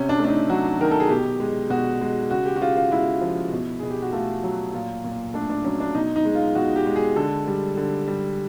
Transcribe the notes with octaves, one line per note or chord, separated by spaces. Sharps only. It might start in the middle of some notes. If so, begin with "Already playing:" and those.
Already playing: C3 C#4
D4
A3
D4
D#4
F#3 F#4
D#3 A#4
A4
G#4
B2 G4
G#3
B2 F#4
G#3
C#3 F#4
G4
F#4
C#3 F4
F4
G#3 E4
F3
B2
B2 G#4
G4
F#4
A3 F4
F#3
A#2 F4
A#2
A3 D4
D4
F#3 C#4
D4
B2 D#4
D#4
G#3
F4
B2 F#4
G4
G#3
G#4
D3 A4
G3
D3
G3